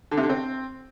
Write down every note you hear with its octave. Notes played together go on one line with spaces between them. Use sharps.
D3
C3
D3
C4